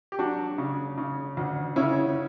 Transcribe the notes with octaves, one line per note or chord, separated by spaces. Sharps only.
G4
F#3 D4 F#4
C#3
C#3
D2
C#3 C#4 E4